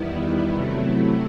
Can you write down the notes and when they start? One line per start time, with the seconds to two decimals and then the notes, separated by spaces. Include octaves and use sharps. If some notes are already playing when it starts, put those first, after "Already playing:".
Already playing: E2 D#3 G3 B3 E4
0.53 C3 F#3 A3 E4